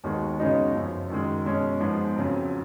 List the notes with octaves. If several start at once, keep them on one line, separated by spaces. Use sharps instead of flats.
D#2 D#3 G#3 B3 F#4
C#3 G#3 B3 D#4 F#4
F#2 C#3 F3
F#2 D#3 G#3
B2 G#3 C#4
G#2 F3 G#3 B3
F2 C#3 F#3